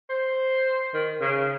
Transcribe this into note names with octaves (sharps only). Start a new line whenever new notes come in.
C5
D#3
C#3